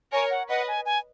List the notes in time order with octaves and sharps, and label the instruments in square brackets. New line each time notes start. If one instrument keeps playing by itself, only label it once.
[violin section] A#4 C#5 [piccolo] G#5
[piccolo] F#5
[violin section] B4 D#5 [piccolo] F#5
[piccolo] G#5
G#5